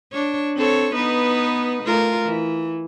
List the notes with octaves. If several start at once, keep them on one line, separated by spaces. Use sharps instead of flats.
D4 C#5
C4 A4 C#5
B3 D#4 B4
A3 F4 A#4
E3